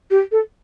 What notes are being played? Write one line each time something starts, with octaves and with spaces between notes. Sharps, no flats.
G4
A4